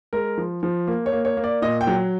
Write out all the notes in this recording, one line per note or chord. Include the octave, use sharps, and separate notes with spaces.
G#3 A#4
F3
F3
A#3
C#5
A#3
C#5
A#3
D5
A#2 D#5
G5
F#3